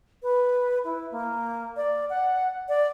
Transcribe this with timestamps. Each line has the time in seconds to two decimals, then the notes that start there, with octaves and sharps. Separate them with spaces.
0.23 B4
0.84 E4
1.12 A#3
1.77 D5
2.10 F#5
2.69 D5